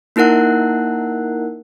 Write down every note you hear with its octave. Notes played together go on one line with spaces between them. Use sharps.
A#3 D#4 E4 A#4 F#5 F#6